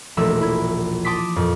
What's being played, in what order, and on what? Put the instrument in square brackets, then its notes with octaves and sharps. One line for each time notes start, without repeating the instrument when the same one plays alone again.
[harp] E1 A#1 A3 E5 E6 E7
E4 G#6
A5 C6 D6 D#6 B6
F2 A#2